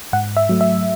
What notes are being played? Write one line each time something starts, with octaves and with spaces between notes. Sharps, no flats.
G#2 F#5
E5
F#3 A3
E5